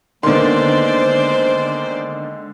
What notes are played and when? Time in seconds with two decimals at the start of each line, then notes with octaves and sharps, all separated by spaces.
0.23 D3 D#3 G#3 A#3 B3 C5 D5 C6